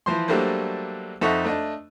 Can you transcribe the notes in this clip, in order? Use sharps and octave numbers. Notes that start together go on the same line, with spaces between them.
E3 F3 C5 C6
F#3 G3 A3 A#3 D4 C5
F2 D#4 A4 E5 F#5 C#6
A3 D4 D#5